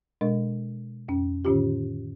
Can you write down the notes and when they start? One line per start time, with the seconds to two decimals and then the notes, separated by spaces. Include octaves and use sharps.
0.21 B2 G#3 D4 A#4 D#5
1.08 F2 C#4
1.45 A2 D3 D#3 C#4 F4 G4